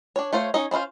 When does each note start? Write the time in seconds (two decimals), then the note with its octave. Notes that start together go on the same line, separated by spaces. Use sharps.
0.16 D4 C#5
0.33 A3 F4 C5 C#5
0.54 C#4 D#4 C#5 D#5
0.71 C4 C#4 E4 F4 C5